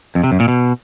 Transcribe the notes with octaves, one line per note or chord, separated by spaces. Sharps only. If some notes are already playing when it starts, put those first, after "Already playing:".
F2
C3
F#2
A#2
B2